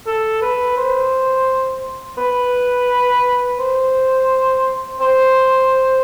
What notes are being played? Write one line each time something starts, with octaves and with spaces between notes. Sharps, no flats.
A4
B4
C5
B4
C5
C5